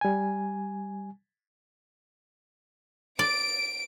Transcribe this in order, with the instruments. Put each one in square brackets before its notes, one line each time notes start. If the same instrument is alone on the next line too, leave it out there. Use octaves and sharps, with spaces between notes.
[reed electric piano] G3 G#5
[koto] D5 [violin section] D7